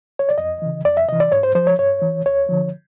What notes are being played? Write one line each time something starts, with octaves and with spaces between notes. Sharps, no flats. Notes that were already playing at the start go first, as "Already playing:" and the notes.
C#5
D5
F2 D#5
C#3 E3
F2 D5
E5
C3 E3 D#5
D5
G#2 C#5
C5
F3 C5
C#5
G2 C#5
E3
D2 C#5
D3 F3